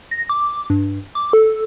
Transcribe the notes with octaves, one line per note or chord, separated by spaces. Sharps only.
A#6
D6
G2
D6
A4